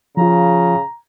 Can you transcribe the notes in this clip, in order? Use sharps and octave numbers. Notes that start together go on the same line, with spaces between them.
C#3 F3 F4 A#5